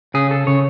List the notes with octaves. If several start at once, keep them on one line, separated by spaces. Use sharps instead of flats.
C#3 G#4
A4
C#3 C#5